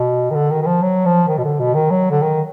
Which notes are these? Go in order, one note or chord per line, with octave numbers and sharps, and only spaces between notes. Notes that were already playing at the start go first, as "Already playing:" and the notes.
Already playing: B2
D#3
D3
D#3
D#3
F3
F#3
F3
D#3
B2
D3
B2
D#3
F#3
D3
D#3